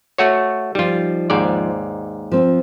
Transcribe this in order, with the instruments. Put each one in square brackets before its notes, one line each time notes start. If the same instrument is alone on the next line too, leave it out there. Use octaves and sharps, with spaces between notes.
[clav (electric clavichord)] A3 F#4 C#5
[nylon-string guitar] F3 D#4 [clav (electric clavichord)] G3 F4
[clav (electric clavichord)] D#2 G#2 D5
[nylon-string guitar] F3 C4